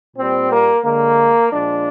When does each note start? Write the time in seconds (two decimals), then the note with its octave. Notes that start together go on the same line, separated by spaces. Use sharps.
0.16 A#2 G3 C4
0.50 A#3
0.83 D3 G#3 A#3
1.50 A#2 F3 G#3 D4